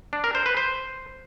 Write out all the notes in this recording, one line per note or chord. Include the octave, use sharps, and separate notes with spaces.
D4
A#4
C5
B4
C5